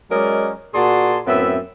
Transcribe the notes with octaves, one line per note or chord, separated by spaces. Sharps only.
F#3 G#3 C#4 A#4 D5 D#5
A#2 F#4 G#4 D5 A5 C6
F#2 A2 B3 C4 E5